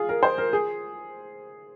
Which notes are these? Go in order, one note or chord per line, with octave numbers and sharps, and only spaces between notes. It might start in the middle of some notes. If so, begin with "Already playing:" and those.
Already playing: F4 G#4
A#4
C5
A#4
G#4